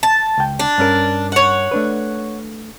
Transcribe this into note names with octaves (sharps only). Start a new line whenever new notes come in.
A5
C#2 G5
D4
G2 C#4 A#4
C#5 F#5
A3 D4 B4